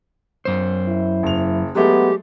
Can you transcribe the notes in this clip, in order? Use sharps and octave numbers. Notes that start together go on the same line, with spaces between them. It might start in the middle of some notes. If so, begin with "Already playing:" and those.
F#2 C5
E4
F#1 F7
F#3 G#3 A3 B3 G4